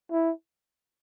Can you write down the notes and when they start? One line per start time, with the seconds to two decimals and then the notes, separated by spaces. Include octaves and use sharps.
0.11 E4